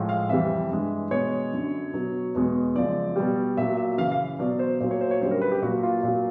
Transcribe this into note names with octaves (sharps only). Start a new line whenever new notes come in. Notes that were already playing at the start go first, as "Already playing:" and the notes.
Already playing: A2 F3 G#3
F5
F2 C3 E3 G3 E5
G2 E3 G#3
B2 G#3 C#5
F#2 D3 F#3
B2 F#3
E2 B2 G#3
F#2 C#3 F3 G#3 D5
B2 G3
A#2 F#3 E5
E5
F#2 C#3 E3 F5
F5
B2 F#3 D5
C5
A#2 F#3 C5
C#5
C5
C#5
F#2 D3 G3 C5
A#4
B4
G4
A#2 F#3 F#4
F4
A#2 F#3